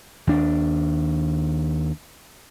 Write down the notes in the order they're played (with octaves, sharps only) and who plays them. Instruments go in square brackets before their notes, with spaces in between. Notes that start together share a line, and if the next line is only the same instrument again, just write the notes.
[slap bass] D#2 D4